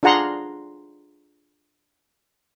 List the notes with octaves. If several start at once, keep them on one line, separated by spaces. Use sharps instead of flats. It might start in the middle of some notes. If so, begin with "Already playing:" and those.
D4 F4 G#4 F#5 A#5 C6